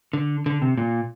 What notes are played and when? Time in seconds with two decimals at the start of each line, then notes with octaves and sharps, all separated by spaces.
0.13 D3
0.46 D3
0.62 C3
0.77 A#2